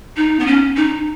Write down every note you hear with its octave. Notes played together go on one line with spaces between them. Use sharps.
D#4
B3
C#4
D#4